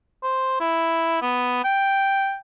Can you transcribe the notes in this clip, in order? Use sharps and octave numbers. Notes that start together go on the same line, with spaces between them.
C5
E4
B3
G5